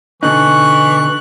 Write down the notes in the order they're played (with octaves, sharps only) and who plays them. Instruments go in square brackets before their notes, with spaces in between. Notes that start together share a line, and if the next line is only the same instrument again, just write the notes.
[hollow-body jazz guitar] B2 D3 D#4 [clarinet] E3 [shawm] C#6 [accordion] F#6